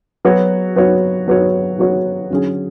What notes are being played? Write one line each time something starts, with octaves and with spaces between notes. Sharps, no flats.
F#3 B3 F#4 C#5
F#3 B3 F#4 C#5
F#3 B3 F#4 C#5
F#3 B3 F#4 C#5
D3 F#3 C#4 G#4